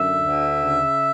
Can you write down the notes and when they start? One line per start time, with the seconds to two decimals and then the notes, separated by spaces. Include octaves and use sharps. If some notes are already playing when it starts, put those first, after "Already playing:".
Already playing: F#2 D3 E5
0.20 D2
0.58 C#3